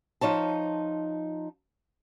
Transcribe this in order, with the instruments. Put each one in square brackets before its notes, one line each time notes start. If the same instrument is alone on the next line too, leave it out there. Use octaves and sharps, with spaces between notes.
[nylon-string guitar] F3 D#4 C#5 A5